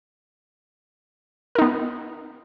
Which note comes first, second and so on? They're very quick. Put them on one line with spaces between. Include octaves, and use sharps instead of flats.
A#4 D#4 B3